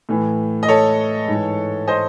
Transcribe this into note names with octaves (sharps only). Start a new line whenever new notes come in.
A2 E3
D#5
A4 C#5
G#2 E3
C5 D#5